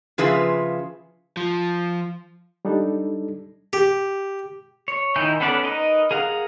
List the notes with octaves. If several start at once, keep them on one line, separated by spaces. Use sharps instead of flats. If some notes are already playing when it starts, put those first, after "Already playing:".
C#3 F3 F4 G#4 B4 E5
F3
G3 D4 D#4 A4
G4
C#5
D#3 D#4 E4 G#5 G6
B3 C#4 A4 B4 D5
D#4 A#4 B4 D#5
G#4 A#4 F5 F#5